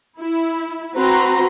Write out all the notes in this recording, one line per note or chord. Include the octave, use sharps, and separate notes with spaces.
E4
C4 F#4 B4 A#5 C6